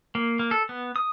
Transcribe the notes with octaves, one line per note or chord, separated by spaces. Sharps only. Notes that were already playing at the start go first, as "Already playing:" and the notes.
A#3
A#3
A4
B3
D#6